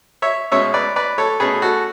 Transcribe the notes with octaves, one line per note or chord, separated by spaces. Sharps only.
C#5 E5
B2 G#3 C#4 C#5 E5
B4 D5
B4 D5
A4 C#5
B2 A3 C#4 G#4 B4
F#4 A4